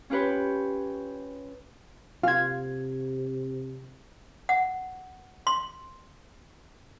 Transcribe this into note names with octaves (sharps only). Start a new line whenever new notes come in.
C#4 F4 G4 B4 C#5
C3 F4 F5 G#6
F#5
C6